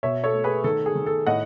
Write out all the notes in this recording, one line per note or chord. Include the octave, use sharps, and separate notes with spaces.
B2 C#5 E5
A4 C#5
A3
G#4 B4
D#3 A4
G#4
D#3
A4
A2 D#5 F#5